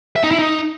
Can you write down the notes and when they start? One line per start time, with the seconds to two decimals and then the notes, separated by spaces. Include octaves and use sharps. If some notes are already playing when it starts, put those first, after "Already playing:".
0.16 E5
0.24 D#4
0.31 E4
0.39 D#4